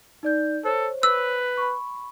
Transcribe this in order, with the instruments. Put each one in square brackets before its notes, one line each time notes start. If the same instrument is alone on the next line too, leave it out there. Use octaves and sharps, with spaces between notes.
[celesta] D#4 D5 G6
[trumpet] A4 [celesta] C5 C#5
[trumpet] B4 [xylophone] E6
[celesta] B5 C#6